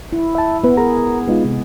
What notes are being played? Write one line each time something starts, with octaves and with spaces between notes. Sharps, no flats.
E4
E5 A5
B3 E4 B4
G#4 A#4 A#5
G#3 B3 D#4 F4
C3